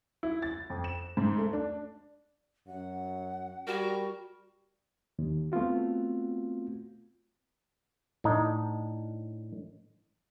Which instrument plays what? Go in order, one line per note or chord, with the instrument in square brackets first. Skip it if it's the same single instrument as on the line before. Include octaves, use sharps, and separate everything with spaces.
[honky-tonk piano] E4
A6
F2
E7
G#2
A3
D4
[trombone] F#2 [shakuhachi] F#5
[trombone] G3 [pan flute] F#4 [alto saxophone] A#4
[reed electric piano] D#2
A3 B3 C4 F4 F#4
[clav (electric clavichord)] A2 D4 D#4